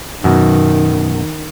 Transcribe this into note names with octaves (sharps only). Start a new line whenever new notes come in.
F#2 B2 D#3